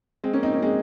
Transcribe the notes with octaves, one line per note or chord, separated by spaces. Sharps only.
G#3 C4
A#3 C#4
C4 D#4
A#3 C#4
G#3 C4